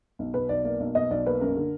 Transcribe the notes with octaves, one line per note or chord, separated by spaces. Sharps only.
B1
B2 B4
B1 D5
A#3 D5
B1
B2 D#5
B1 D5
A#3 B4
F#2 A#4
D3